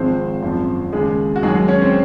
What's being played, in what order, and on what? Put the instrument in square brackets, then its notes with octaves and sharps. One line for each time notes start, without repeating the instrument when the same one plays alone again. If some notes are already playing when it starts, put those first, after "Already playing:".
Already playing: [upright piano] G#1 G#2 F3 G#3 C4 C5
G#1 F#2 F3
D#2 C#3 G#3 G#4
F#4
D#2 D#3 F#3 G#3 G#4
C#4 C#5
C4 C5